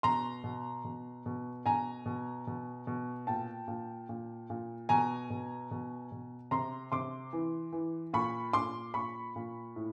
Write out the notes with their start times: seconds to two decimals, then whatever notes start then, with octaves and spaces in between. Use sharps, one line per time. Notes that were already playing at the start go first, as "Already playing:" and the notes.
0.03 B2 A#5 C6
0.44 B2
0.85 B2
1.26 B2
1.66 B2 G#5 A#5
2.06 B2
2.47 B2
2.87 B2
3.27 A#2 G5 A5
3.68 A#2
4.09 A#2
4.50 A#2
4.89 B2 G#5 A#5
5.30 B2
5.71 B2
6.12 B2
6.51 C3 A#5 C6
6.92 C3 C6 D6
7.33 E3
7.73 E3
8.13 A#2 B5 C#6
8.53 A#2 C6 D6
8.94 A#2 B5 C#6
9.36 A#2
9.76 A2